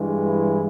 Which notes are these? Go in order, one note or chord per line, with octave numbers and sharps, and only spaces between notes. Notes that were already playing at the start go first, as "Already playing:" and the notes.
Already playing: G2 E3 G#3
E4